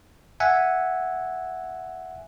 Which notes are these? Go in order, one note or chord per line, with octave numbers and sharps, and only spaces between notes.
E5 F#5 G#5